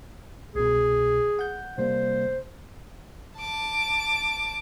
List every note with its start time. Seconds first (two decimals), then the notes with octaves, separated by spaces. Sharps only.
0.55 C2 B2 G#4
1.39 F#5 G6
1.78 C3 G3 A#3 C5
3.38 A5 D6